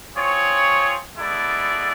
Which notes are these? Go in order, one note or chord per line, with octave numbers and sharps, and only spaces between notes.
C4 F4 G#4 C#5
G#3 B3 E4 A4 D5